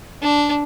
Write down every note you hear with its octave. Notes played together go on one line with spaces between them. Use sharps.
D4